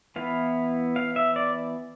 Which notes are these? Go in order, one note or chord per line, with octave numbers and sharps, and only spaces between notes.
E3 B3 E4 F5
F5
E5
D5